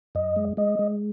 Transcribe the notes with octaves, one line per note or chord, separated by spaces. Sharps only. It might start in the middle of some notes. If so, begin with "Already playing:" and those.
F#2 D#5
G#3
G#3 D#5
G#3